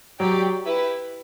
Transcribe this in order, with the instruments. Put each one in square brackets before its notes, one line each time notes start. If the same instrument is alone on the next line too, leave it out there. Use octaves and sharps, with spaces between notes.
[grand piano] F#3 [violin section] G4 D5 G5
[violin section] E4 G4 B4 E5